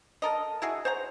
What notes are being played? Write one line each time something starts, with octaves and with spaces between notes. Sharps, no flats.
A4 A#4 D#5
E4 F#4 G#4
C5 C#5 F#5 A#5